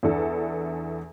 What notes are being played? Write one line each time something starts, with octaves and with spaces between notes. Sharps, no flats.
E2 E3 D4 A4